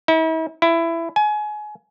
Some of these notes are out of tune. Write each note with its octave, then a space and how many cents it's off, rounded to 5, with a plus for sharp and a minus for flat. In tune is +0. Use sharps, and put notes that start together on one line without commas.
E4 -45
E4 +15
G#5 +25